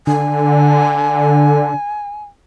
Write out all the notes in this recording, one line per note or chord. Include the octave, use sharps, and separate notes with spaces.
D3 G#5